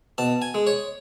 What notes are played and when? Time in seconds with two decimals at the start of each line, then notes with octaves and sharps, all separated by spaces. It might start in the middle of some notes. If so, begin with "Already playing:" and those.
0.18 B2 A5
0.42 G#5
0.54 G#3
0.67 C#5